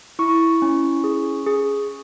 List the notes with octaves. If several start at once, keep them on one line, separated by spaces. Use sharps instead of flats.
E4 C#6
C#4
G#4
G#4